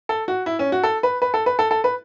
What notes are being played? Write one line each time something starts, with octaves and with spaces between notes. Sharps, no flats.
A4
F#4
E4
C#4
F#4
A4
B4
B4
A4
B4
A4
A4
B4